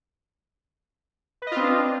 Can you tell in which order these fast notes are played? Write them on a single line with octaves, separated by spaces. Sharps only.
B4 D#5 F4 C4 D4